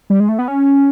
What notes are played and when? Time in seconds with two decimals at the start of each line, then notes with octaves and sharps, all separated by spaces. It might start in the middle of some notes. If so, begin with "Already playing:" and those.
0.10 G3
0.20 G#3
0.29 A3
0.39 B3
0.48 C#4